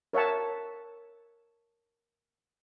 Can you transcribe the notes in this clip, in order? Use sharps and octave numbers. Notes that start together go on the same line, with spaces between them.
A#4 C#5 E5 F#5 A5